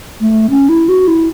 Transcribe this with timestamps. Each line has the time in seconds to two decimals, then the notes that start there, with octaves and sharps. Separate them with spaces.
0.21 A3
0.50 C#4
0.69 E4
0.88 F#4
1.08 E4